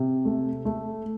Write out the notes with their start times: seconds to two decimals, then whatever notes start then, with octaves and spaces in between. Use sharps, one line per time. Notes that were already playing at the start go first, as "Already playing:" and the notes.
Already playing: C3
0.25 A3
0.65 A3